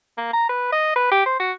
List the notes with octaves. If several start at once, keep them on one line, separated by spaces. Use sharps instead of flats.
A#3
A#5
B4
D#5
B4
G4
C5
F#4